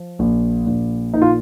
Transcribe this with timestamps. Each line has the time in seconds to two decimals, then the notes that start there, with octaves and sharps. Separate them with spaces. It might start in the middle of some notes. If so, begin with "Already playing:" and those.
Already playing: F3
0.19 A#1
0.67 A#1
1.14 A#2 D#4
1.22 F4